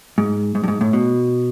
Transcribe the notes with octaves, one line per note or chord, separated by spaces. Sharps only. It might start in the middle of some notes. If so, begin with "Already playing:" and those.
G#2
G#2
G2
G#2
A2
B2